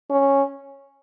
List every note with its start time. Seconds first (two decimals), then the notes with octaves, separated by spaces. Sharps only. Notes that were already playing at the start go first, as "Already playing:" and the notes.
0.10 C#4